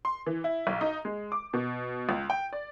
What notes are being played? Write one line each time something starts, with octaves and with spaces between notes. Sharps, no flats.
C6
E3
E4
B1
D#4
G#3
D6
B2
C#2
G5
D5